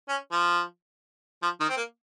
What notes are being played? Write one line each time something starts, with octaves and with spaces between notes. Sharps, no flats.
C#4
F3
F3
D#3
C4
A#3